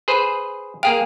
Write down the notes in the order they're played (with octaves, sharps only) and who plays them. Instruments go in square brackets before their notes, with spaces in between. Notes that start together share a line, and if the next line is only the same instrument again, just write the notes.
[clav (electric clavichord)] G#4 B4 C5
[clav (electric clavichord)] A#3 G#4 F5 [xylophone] G5